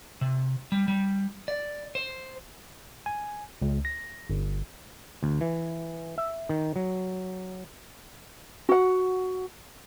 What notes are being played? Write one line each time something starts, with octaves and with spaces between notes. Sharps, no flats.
C3
G3
G3
D5
C5
G#5
C#2
A#6
G1
D2
E3
E5
D#3
F#3
F#4 F#5